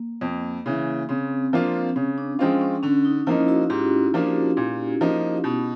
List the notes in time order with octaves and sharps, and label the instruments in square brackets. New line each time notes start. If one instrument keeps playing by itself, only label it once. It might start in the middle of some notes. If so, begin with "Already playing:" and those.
Already playing: [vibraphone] A#3
[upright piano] F2
C#3 E3
[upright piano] C#3 [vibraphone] C4
[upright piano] F3 A#3 D4 F4
[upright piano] C#3 [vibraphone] C#4
[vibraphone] D4
[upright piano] F3 G#3 C4 F4 [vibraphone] C#4
[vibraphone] C#4
[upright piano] D3 [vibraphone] C#4
[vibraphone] D#4
[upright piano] F3 A#3 D#4 [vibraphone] E4
[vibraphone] E4 F#4
[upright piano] G#2 [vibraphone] F4 G4
[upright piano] F3 A#3 D4
A#2
F3 A#3 D#4
B2